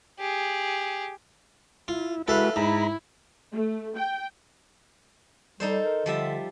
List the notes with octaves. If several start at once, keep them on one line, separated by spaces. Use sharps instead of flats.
G4 G#4
E4 F4
G#3 E4 F#4 A4 B4 E5 F5
G#2 E4 A#5 B5
A3
G5
G3 D#4 A4 C5
A#4
D3 F3 G3 E5